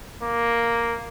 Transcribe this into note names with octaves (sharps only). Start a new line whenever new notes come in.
A#3